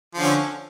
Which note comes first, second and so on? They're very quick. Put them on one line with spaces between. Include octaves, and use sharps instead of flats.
F3 D3 C#4